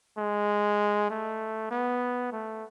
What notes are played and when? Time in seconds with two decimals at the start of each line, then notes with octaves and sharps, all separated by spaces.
0.18 G#3
1.10 A3
1.71 B3
2.32 A3